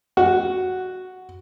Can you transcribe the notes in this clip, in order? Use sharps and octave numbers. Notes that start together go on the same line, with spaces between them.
F#4